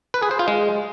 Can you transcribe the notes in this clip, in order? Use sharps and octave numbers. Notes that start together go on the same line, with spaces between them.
B4
G#4
C5
F4
G#3